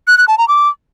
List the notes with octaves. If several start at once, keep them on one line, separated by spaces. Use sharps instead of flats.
F#6
F#6
A5
A#5
D6